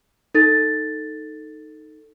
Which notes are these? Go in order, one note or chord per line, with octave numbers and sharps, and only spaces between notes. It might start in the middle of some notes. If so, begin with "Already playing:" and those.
D#4 A4 A6